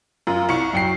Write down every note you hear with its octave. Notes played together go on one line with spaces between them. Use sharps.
F#2 F4
C2 C#6 C#7
F#2 G5 C7